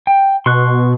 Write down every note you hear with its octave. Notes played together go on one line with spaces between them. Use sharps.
G5
B2 C6 C#6 F#6